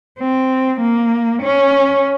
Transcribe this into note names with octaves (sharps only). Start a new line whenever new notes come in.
C4
A#3
C#4